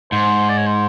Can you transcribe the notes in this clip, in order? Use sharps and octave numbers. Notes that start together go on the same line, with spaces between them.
G#2 C5
D5
C#5
C5